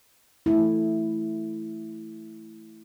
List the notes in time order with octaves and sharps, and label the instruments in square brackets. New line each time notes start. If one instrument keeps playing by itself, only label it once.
[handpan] A3 E4